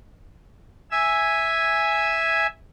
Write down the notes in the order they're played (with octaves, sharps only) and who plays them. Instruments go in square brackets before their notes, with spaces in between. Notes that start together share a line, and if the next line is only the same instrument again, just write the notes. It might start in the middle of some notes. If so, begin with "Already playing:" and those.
[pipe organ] E5 G#5 E6